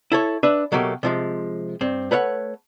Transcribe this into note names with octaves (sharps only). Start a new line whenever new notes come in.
E4 A4 C#5
D4 B4 E5
B2 F#3 A3 A#3 G4
C3 F3 G#3
G2 C4
A3 B4 C#5 F5 F#5